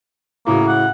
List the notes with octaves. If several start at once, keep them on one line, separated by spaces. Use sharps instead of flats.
A2 C#3 A#3 F#4
F#5